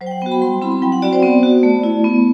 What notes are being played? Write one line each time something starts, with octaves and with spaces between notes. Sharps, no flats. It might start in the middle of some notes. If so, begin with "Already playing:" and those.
F#3 C5
G5
F#5
B3 F#4 G5
B5
G3 C6
C4 E4 B5
B5
F#3 G5
F#5
C4 F#4 D5
C5
B3 D5
F#4
A3
E4
B3